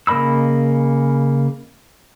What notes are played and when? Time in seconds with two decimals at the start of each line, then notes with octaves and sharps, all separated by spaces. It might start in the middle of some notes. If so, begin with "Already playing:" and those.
0.07 C#3 A#3 D#5 B5 E6